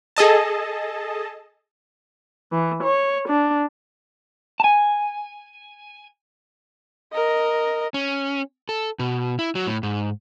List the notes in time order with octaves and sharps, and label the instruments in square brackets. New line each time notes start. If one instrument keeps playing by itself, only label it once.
[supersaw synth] G#4 A4 D#5 A5
[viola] E3
C#5
D4
[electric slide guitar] G#5 A5
[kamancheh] A#4 D#5
[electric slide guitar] C#4
A4
B2
E4
F#3
A2
G#2